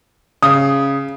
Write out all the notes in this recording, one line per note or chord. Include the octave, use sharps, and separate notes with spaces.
C#3 D#6